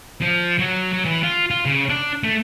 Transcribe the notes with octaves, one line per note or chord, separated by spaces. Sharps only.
F3
F#3
F#3
E3
F4
F4
C#3
D4
A3